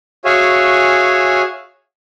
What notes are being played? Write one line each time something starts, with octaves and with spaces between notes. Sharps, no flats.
F#4 G#4 C#5 E5 F5 G#5